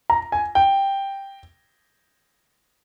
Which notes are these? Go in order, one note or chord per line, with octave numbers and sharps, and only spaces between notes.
A#5
G#5
G5